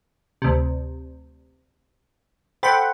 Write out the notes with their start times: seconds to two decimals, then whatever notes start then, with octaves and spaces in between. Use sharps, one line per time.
0.42 D2 C3
2.63 A4 C5 F#5 G5 B5